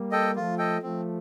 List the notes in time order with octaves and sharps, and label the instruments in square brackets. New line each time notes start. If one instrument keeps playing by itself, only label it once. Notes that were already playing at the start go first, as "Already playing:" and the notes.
Already playing: [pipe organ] G3 A#3
[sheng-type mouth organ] A4 D#5 G5
[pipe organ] F3 A3 [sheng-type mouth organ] F4
[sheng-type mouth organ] A4 D#5 G5
[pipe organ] F3 A3 [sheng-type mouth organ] C4